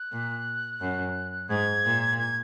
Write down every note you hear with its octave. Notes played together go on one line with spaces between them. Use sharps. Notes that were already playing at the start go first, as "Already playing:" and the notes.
Already playing: F#6
A#2
F#2
G#2 G#6
A#2
G#6